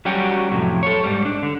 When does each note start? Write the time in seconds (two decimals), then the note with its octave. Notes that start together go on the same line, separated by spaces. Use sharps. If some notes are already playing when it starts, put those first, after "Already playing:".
0.05 F#3 G3 C#4 F#4 G4
0.51 F2 A2 C3 F#3
0.83 A4 C#5
1.04 G#2 G3
1.25 D4
1.43 D3